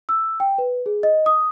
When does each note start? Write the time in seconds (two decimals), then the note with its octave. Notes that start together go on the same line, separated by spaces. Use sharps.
0.09 E6
0.40 G5
0.58 B4
0.86 G#4
1.03 D#5
1.26 D#6